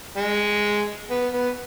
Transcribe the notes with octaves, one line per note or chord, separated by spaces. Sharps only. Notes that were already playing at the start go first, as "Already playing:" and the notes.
G#3
B3
B3